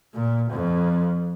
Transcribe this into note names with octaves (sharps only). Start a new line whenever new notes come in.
A#2
F2